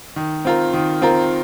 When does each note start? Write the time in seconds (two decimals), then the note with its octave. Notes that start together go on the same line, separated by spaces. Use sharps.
0.16 D#3
0.45 C4 F4 A#4
0.73 D#3
1.02 C4 F4 A#4